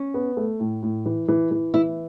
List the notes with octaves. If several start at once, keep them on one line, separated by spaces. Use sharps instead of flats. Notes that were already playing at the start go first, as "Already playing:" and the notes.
Already playing: C#4
B3
A3
A2
A2
E3
E3
E3
E3 E4